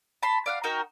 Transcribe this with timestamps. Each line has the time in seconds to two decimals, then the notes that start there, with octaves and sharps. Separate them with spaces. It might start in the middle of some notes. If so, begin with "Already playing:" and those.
0.23 A5 B5 C6
0.46 D5 F5 F#5
0.64 D#4 F#4 A#4 G5